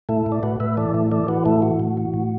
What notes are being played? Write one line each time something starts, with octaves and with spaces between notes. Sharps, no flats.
A2 E4 A4
A2
D5
A2 F#4 B4
A2 B4 E5
E3 A4 D5
A2 E4 A4
E3 A4 D5
E3 F#4 B4
A2 E4 A4
E3 F#4
A2
E3
A2